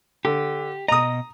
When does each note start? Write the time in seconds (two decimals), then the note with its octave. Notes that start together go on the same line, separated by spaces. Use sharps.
0.25 D3 G4
0.88 B2 D#5 A#5 D#6